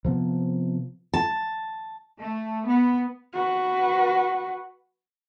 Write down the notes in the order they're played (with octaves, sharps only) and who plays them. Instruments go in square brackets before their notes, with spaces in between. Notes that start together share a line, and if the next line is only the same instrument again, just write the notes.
[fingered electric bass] C3 F3 B3
[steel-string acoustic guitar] A5
[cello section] A3
B3
[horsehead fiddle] F#4 B4